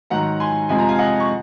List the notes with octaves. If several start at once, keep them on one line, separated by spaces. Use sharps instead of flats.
G#2 D#3 F#3 F#5 A#5
G#5 C6
F2 C3 F3 G#3 G#5
A#5
F5 G#5
D#5 F#5
C#6